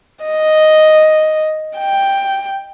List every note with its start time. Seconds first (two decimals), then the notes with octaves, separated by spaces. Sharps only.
0.24 D#5
1.78 G5